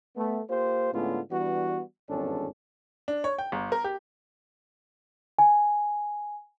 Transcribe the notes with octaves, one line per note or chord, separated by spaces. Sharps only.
A3 B3
A#3 F4 G4 C5
A2 D3 G#3 B3 C#4 F4
E3 G3 B3 D4 F#4
G#1 E2 G2 C#4 D4 A4
D4
C#5
G5
G1
A#4
G4
G#5